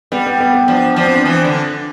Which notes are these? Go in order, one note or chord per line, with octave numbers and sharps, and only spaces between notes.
G3 B3
B3
B3
B3
F3 D4
F3 D4
C4
D4
E3
D3